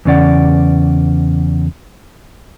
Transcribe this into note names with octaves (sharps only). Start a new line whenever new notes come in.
E2 C#3 C#4 D5 F#5